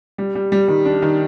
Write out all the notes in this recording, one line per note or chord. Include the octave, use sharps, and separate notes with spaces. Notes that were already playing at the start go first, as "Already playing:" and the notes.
G3
G3
G3
D#3
D4
D#3